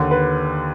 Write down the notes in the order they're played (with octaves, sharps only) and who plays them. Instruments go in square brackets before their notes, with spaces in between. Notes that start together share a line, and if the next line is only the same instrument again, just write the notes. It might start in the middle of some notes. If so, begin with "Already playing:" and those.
Already playing: [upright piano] D#2 D3
B4